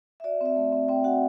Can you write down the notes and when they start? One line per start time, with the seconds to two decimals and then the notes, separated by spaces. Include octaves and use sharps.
0.20 E5
0.24 F#4 D5
0.41 C4 E5
0.56 A3
0.72 C4
0.89 C4 G5
1.04 F#4 F#5